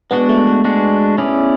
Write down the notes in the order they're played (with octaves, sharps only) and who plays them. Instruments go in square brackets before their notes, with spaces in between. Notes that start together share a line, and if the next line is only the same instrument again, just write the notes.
[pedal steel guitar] G#3 D4 F#4 [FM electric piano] B3
[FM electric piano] A3
A3
[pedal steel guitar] G#3 D4 F#4
C#4 E4 G#4 D5